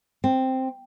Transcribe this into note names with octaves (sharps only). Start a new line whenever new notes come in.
C4